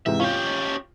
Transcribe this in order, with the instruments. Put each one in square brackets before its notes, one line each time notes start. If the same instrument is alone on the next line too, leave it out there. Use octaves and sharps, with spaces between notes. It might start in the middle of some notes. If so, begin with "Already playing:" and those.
[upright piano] G#2 C3 E3 [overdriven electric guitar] E5
[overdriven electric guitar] C#4 G4 [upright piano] F4